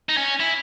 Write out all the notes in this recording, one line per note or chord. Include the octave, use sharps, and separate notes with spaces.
D#4
C#4
E4